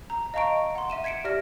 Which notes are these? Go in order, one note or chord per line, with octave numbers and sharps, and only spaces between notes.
A#5
D#5 F5 A5 A#5 C#6 D7
F#5 C6
E5 D#7 E7
G#6 B6 C#7 D7 E7
G4 D5 E5 F6 A#6